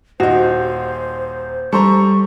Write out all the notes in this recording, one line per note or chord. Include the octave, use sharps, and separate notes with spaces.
D#1 D#4 F#4 C5
G3 A4 C5 A#5 C#6